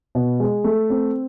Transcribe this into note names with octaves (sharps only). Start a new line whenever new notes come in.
B2
G#3
A3
C4